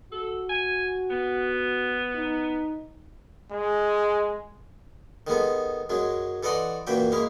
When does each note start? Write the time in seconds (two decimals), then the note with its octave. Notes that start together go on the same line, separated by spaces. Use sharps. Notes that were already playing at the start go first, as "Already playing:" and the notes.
0.12 F#4 A4
0.49 G#5
1.10 B3
2.15 D#4
3.52 G#3
5.27 D#3 G#3 B3 A4
5.89 F#2 F#3 G#3
6.43 E3 A4 D5 D#5 F#5 C6
6.87 F#2 A#2 E3 F#3 E5 G5
7.12 G#3 A#3 E4 F5